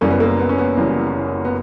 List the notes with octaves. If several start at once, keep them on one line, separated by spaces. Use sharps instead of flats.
F#1 F#2 E3 G3 A#3 C#4
B3
A#3
B3
C#4
B3
F#1 F#2 E3 G3
B3